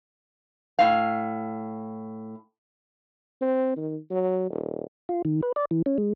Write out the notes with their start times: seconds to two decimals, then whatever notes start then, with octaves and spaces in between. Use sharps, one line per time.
0.79 A2 F5
3.41 C4
3.77 D#3
4.10 F#3
4.50 D#1
5.09 F4
5.25 D#3
5.43 B4
5.56 D5
5.71 E3
5.86 C#4
5.98 G#3